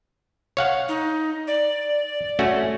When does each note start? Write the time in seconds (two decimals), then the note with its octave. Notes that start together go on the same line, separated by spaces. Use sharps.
0.57 C#5 F5 F#5
0.88 D#4
1.47 D5
2.39 A3 C#4 F#4